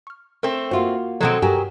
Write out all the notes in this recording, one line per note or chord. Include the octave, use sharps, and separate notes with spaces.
C#6 F6
A3 C4 A#4
A#3 F4 F#4 C5 E5
B2 D#3 F3 F#3 G#3 C4 A4 F#5
G2 F#3 G4 G#4 A#4